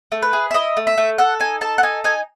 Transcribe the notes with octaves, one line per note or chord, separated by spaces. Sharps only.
A3
B4
G#4
E5
E4 D#5
A3
E5
A3
A4 F#5
D#4 G#5
A4 A5
F#5
D#4 G#5
D#4 G#5